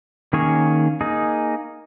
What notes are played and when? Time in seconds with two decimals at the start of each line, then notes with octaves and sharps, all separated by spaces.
0.33 D#3 A#3 C#4 G#4 C#5
1.01 A#3 D#4 G#4